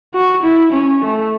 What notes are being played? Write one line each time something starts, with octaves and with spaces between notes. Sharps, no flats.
F#4
E4
C#4
A3